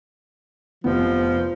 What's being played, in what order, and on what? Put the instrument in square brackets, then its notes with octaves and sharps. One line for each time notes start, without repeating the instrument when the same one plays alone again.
[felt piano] F1 B3 [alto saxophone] F3